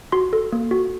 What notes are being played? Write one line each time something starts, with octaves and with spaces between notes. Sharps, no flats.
F#4 C6
A4
A#3
F#4